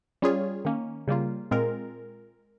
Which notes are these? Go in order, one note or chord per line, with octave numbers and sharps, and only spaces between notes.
G3 C#4 F4 G#4 C#5
D#3 A#3 C#4
C#3 G3 A#3 F4
A#2 G#3 C4 F4 A#4